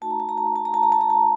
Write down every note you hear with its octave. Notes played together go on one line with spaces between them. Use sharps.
A3 D#4 F#4 A5
A#5
A5
A#5
A5
A#5
A5
A#5
A5
A#5
A5
A#5
A5